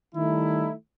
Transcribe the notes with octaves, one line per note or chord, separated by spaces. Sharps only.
D#3 G3 A3 D#4 E4